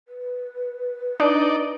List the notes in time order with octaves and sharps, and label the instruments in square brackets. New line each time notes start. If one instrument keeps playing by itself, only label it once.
[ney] B4
[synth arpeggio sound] D4 [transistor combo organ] D#4 D5